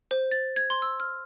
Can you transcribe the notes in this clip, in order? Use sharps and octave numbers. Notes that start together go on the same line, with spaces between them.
C5
A6
G#6
C6
E6
F6